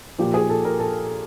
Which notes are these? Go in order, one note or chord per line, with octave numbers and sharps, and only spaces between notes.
A#2 F3 G4
G#4
A4
A#4
A4